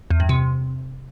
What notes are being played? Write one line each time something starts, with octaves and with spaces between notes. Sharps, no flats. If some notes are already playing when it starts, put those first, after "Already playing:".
E2
G2
C3